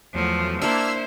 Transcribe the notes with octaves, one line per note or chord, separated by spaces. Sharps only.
E2 F3 F#3 A3
A#3 D4 E4 C5 E6 F6 G#6